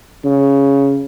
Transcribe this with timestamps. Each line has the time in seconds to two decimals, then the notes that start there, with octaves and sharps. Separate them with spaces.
0.24 C#3